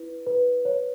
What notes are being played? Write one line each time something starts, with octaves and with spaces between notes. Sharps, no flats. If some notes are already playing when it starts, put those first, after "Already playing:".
Already playing: E4 B4
B4
C#5